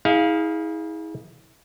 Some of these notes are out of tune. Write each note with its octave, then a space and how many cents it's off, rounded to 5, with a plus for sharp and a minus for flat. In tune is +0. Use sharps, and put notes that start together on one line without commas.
E4 -40 G#4 +0 F5 +0